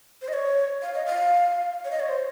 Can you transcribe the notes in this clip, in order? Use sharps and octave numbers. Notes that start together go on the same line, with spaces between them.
C5
D#5
C#5
F5
D#5
F5
C#5
D#5
C#5
C5